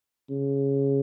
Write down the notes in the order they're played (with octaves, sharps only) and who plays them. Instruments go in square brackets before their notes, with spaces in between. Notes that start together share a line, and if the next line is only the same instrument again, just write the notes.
[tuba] C#3